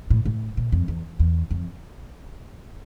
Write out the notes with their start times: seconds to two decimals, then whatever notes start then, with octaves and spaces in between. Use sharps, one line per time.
0.10 A2
0.25 A2
0.57 A#2
0.72 F2
0.88 E2
1.19 E2
1.51 F2